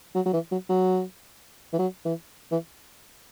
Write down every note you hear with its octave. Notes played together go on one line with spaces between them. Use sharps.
F#3
F#3
E3
F#3
F#3
E3
F#3
E3
E3